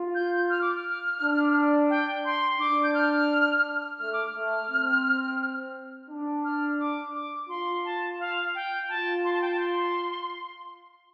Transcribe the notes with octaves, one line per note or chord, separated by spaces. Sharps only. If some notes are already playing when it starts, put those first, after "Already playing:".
Already playing: F4
G6
F6
D6
F6
D4
G5
C6
D4 D6
G6
F6
A3 F6
D6
F6
A3
C4
D4
F6
D6
D6
F4 C6
A5
F5
G5
F4 A5
C6
A5
G5
A5
C6